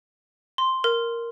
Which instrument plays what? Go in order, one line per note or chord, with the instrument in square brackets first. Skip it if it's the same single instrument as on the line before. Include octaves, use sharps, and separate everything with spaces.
[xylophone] C6
A#4